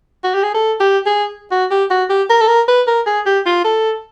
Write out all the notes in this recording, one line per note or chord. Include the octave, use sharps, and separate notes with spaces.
F#4
G4
G#4
A4
G4
G#4
F#4
G4
F#4
G4
A#4
A4
A#4
B4
A#4
G#4
G4
F4
A4